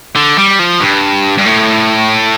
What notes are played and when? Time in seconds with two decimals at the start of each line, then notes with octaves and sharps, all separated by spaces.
0.16 D3
0.38 G3
0.59 F3
0.80 G2
1.38 G2
1.45 A2